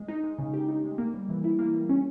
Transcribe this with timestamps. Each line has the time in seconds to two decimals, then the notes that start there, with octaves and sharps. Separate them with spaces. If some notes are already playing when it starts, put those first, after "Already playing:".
Already playing: G#3
0.08 D#4
0.23 G#3
0.39 C#3
0.53 G4
0.68 D#4
0.84 G#3
0.98 A#3
1.14 G3
1.29 E3
1.44 E4
1.59 A#3
1.74 G3
1.89 C#4